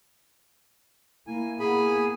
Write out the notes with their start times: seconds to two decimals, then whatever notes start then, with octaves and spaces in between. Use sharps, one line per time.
1.27 A#3 E4 G#5
1.59 A#3 B3 G#4 G#5 B5